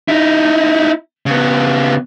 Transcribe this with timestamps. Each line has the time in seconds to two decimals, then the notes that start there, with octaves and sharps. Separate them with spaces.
0.08 D#4 E4
1.26 C#3 B3